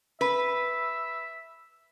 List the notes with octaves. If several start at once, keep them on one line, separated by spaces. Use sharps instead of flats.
B4 E5